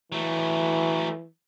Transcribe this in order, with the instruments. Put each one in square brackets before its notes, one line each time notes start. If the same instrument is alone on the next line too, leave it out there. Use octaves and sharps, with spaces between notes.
[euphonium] E3 [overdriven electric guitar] F#3 A3